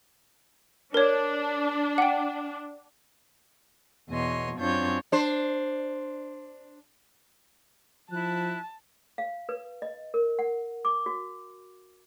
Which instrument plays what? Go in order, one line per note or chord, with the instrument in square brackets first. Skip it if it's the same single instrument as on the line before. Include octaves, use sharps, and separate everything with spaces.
[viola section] D4 [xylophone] A#4 C#5
[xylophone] F#5 G5
[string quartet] E2 B2 C#5 D#5 C6
F#2 C4 D4 F4 C#5 G6
[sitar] D4 C5
[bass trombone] F3 [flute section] E4 F#6 [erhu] A5
[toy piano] F5
B4
D#5
A#4
F#5
D6
F#4